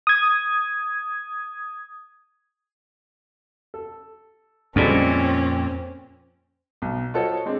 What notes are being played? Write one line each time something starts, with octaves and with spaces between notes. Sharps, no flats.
D#6 G#6
A4
F2 A#2 D3 G3 G#3 C4 C#4
B1
F4 F#4 A4 C5 C#5 D#5
G#3 C4 D4